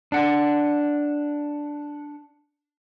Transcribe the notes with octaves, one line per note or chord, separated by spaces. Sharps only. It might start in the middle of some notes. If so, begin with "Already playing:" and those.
D4 F#5